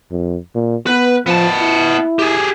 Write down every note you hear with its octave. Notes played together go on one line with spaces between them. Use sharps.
F2
A#2
B3 B4
F3 B3 A5
E4
G4 G#4